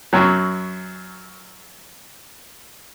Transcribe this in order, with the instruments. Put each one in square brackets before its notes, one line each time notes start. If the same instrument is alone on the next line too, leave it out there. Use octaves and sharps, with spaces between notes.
[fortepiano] F#2 F#3